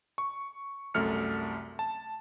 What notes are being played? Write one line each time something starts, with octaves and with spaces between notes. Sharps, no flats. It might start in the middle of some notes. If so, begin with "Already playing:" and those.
C#6
C2 F#2 A3 F6 C#7
A5